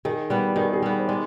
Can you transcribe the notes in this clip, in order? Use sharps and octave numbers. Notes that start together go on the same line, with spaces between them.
D#3 G#4
G3 B3 B4
B4
D#3 G#4
G#4
G3 B3
C5
G#3 D5